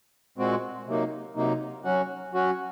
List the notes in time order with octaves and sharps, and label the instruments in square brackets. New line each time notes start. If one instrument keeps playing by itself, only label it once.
[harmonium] A#2 G#3 C4 F#4
C3 F#3 A#3 D#4
C3 F#3 A#3 D#4
F#3 C#4 F#4
F#3 C#4 F#4